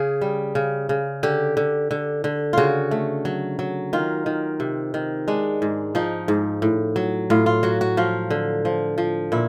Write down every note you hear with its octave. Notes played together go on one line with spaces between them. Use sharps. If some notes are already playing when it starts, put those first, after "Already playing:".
Already playing: C#3 G#4
G3
C#3
C#3
D3 G4
D3
D3
D3
C#3 F4 F#4
A3
F#3
F#3
D#3 F4
D#3
C3
D#3
G#3 D4
G#2
F3 D#4
G#2
A2
F#3
A2 F4
F4
F#3 F#4
F#4
F3 F4
D3
F3
F3
A#2 E4